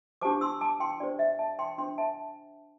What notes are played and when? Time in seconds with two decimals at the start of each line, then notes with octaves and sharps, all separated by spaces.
0.21 D4 G4 C5 A5 D6
0.41 C6 E6
0.61 A5 D6
0.80 G5 C6
1.00 D4 G4 C5 D5
1.19 E5
1.39 E5 A5
1.59 G5 C6
1.78 D4 C5 G5 C6
1.98 E5 A5